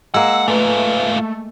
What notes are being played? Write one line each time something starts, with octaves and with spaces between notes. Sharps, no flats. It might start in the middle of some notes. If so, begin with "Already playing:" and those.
G#3 A#3 F#5 E6
G#2 A3 F4 B4